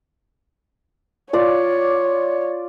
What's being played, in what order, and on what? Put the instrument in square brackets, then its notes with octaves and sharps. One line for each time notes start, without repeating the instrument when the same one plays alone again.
[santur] F4 D5 [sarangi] C#5